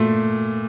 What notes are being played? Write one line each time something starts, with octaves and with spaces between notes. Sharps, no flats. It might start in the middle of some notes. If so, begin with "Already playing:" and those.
Already playing: A#2 A3